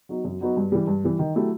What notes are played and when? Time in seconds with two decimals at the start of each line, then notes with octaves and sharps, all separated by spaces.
0.09 F#3 B3 D#4 F#4
0.25 F#2
0.41 F#3 B3 D#4 F#4
0.57 G2
0.72 E3 G3
0.88 G2
1.04 E3 G3
1.19 D#3
1.35 F#3 A3 E4 G4